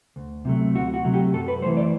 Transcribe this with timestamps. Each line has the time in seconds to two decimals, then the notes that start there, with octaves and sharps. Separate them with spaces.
0.16 D2
0.45 C3 F#3 A3
0.75 D2 F#4
0.94 F#4
1.04 C3 F#3 A3
1.13 G4
1.33 F#2 A4
1.48 B4
1.62 A3 C5
1.66 E3
1.77 D5